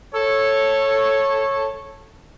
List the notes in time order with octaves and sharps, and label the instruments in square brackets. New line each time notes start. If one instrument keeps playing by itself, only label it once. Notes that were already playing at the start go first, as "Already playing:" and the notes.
[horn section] A4 C#5